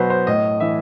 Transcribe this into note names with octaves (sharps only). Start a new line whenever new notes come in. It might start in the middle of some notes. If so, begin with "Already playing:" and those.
Already playing: B2 F#3 B4 C5
C5
A2 D#5
E3 E5